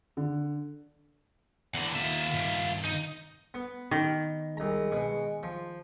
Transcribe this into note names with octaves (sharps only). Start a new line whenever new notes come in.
D3
E2 D3 E4 F#5
D#3 A#3 F4 E5
G2 D#3
D#4
B3
D#3
C2 G#3 A#5
B2
F3